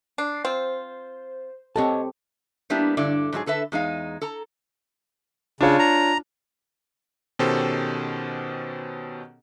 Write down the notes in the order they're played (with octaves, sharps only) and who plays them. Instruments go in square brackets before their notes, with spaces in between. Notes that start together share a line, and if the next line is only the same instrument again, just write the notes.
[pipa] D4 [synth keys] C7
[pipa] C4 F4 [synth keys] C5
[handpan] C4 G4 A4 [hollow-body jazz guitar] C#5 D#5 A5
[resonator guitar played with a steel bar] G3 A#3 B3 D4 E4 G4
G2 D3 E4 D5
G#2 F#3 E4 G#4
D3 A4 B4 E5
E2 G#3 D#4 F5
A4 A#5
[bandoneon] C#3 [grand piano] D4 F4 C#5
[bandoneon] A#5
[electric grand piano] B2 D#3 C#4 G4 A4 C5